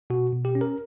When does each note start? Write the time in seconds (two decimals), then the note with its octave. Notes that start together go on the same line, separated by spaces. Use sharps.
0.10 B2 F#4
0.33 B2
0.45 G4
0.55 C#4
0.61 A#4